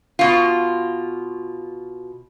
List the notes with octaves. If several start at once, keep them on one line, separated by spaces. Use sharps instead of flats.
B2 F4